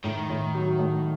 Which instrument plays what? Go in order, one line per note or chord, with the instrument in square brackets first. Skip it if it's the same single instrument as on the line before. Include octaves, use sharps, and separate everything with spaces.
[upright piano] A2 [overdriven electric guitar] D#3
[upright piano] A2
F#3
A3